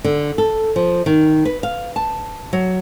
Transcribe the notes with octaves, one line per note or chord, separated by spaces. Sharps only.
D3
A4
F3
D#3
B4
F5
A5
F#3